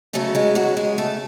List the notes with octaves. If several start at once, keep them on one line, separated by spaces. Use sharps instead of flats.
C#3 F#3 A3 B3 A4
G#3 G#4
F#3 F#4
G#3 G#4
A3 A4